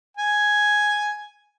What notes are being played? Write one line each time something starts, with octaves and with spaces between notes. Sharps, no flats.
G#5